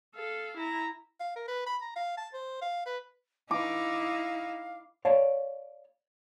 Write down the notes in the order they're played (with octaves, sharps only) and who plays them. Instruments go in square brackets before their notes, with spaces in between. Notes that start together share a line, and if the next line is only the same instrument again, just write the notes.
[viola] A4 F5
E4 A#5
[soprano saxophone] F5
A#4
B4
B5
A#5
F5
A5
C5
F5
B4
[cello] D#4 E4 [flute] F5 [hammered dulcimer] D6
[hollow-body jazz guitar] C#5 D5 F5 A5